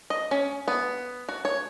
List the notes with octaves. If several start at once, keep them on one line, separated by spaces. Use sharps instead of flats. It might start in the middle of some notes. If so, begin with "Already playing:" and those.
D#5
C#4
B3
F#4
C#5